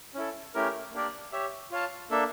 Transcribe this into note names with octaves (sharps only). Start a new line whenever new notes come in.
C#4 E4 A4
A3 C#4 E4 G4 A#4
A#3 D4 G4 A#4 D5
G4 C#5 E5
F4 C#5 F5 A5
A#3 D4 A4 E5